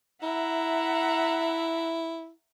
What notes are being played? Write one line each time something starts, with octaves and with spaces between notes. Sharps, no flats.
E4 E5 F#5 A#5